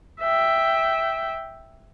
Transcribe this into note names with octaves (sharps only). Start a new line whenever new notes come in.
E5 G5